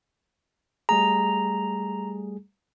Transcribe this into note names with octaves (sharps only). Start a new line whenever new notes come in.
G3 A3 G#4 A#5